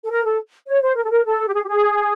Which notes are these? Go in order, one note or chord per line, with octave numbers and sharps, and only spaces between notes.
A4
A#4
A4
C#5
C5
A#4
A4
A#4
A4
G4
G#4
G4
G#4